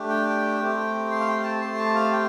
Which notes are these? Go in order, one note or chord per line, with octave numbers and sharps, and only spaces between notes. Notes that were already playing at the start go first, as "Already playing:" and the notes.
Already playing: A3 D4 G4
G5
A3 C4 G4
C6
F5
G5
A5
A3 C4 G4 C6
A5
F5
G5